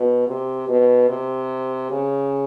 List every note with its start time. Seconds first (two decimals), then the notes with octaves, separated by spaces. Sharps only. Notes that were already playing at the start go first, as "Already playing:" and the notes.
Already playing: B2
0.27 C3
0.68 B2
1.09 C3
1.91 C#3